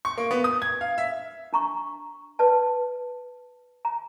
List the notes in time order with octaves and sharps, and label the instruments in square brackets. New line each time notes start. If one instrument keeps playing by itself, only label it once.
[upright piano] C#6
A#3
B3
D#6
G#6
F5
E5
[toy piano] D4 A#5 C#6
B4 D5 A5
A#5